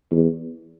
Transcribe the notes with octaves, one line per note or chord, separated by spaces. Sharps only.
E2